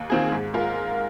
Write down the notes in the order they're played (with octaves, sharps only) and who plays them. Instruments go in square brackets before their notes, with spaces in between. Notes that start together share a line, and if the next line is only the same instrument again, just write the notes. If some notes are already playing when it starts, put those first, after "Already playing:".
Already playing: [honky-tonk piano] D#2
D#3 C4 F4 G#4
G#2
G#3 F4 A#4